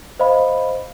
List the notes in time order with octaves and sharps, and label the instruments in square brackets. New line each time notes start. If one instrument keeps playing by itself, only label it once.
[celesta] C5 D#5 F5 B5